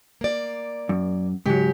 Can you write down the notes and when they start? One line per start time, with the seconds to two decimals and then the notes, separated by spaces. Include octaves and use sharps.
0.21 A#3 D5
0.89 F#2
1.46 G#2 C#3 F#3 G4